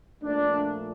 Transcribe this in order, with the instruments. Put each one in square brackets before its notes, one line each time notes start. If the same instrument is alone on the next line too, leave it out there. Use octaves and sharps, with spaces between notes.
[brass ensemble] A#2 F3 A3 D4